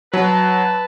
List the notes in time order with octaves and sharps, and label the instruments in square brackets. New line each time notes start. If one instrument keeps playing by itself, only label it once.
[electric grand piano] F#3 [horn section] B4 A5